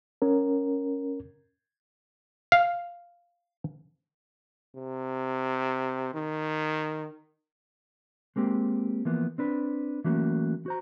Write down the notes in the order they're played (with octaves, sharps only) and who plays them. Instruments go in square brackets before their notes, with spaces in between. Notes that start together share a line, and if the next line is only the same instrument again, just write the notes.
[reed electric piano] C#4 A#4
[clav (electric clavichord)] F5
[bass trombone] C3
D#3
[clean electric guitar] G#3 A#3 C4 G4
E3 F3 A#3 B3
C4 D4 B4
E3 F#3 A3 A#3 C#4 F#4
F#4 C5 A#5